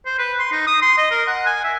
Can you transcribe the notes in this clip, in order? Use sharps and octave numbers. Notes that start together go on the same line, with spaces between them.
C5
B4
C6
D#4
D#6
C6
D#5
A#4
F#5
G#5
E5